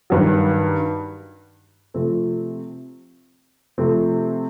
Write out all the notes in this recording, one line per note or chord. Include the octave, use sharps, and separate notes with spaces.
G2 D#3 F#3
C3 F3 A3 C4
C3 F3 A3 C4